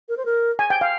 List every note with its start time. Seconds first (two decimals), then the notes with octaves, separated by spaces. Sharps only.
0.09 A#4
0.17 C5
0.25 A#4
0.59 G#5
0.70 G5
0.81 F5